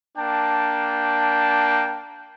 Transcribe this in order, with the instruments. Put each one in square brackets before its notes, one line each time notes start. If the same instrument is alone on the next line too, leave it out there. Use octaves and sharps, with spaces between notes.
[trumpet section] A#3 D4 G5 A5